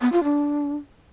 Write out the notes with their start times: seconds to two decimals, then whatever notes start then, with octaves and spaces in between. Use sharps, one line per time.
0.01 B3
0.12 F4
0.24 D4